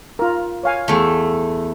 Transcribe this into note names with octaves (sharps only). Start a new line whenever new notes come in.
F4 A#4
C#5 F5 G#5
E2 A3